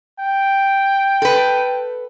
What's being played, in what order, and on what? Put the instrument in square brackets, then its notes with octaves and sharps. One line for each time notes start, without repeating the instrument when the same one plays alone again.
[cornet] G5
[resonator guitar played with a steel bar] A4 B4